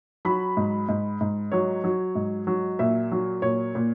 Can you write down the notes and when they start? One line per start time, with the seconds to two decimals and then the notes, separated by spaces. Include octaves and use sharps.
0.25 F#3 B5
0.57 G#2
0.89 G#2
1.21 G#2
1.52 F#3 C#5
1.84 F#3
2.15 G#2
2.47 F#3
2.79 A#2 E5
3.11 F#3
3.42 A#2 C#5
3.75 A#2